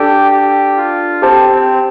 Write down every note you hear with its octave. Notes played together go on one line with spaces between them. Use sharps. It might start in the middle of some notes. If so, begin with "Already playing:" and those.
Already playing: D4 G4 A4 D5 A5
G4
F4
C4 G4 C5 A5
C4